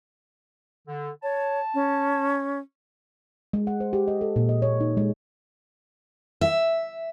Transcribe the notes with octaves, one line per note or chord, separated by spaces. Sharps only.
D3
C#5 A5
C#4
G#3
F#5
C5
G4
D#5
A4
A#2
D#5
C#5
D#4
G#3
E5